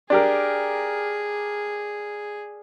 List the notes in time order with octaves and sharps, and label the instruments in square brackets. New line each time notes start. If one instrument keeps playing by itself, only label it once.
[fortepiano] D4 G4 A#4 [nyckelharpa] G#4